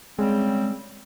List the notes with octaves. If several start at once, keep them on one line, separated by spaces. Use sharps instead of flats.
C#3 G3 G#3 C4